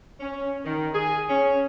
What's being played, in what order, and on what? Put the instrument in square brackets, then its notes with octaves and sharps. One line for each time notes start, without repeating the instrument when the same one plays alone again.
[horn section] C#4
D#3
G#4
C#4